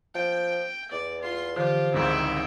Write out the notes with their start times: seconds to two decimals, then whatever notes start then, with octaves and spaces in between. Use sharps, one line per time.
0.15 F3 G5
0.91 E2 D5
1.21 F4 C6
1.56 D3 E3 F3 F4 G4
1.94 G#1 C#2 G#2 E4 G5